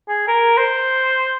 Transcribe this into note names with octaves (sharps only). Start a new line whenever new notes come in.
G#4
A#4
C5